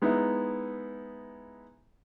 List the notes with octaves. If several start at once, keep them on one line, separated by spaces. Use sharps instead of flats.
G#3 B3 D#4 E4